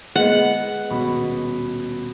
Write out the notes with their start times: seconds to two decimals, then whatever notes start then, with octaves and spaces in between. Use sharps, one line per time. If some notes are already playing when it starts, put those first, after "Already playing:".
0.16 G#3 B3 F#5
0.90 D#1 B2 B5